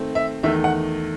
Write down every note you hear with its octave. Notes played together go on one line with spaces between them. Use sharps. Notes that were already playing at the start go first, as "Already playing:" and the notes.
Already playing: D#3 A3 C4
E5
E2 D#3 A3 E5
F#5